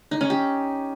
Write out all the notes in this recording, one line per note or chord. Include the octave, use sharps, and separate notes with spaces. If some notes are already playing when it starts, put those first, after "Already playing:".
D#4
C#4
G4